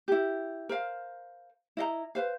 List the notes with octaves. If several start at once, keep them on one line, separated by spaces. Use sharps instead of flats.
E4 G4
A#4 C5 F5
E4 D#5 F5 A#5
B4 C5 F5